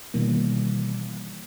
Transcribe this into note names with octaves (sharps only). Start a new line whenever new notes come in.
B2 D#3 E3 G3 A#3